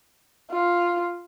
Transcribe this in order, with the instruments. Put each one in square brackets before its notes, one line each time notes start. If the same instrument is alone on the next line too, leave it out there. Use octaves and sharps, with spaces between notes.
[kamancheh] F4